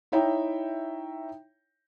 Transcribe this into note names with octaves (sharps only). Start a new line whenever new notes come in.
D#4 E4 C#5 E5 G5 A#5